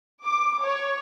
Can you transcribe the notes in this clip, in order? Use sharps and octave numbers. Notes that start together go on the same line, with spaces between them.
D6
C#5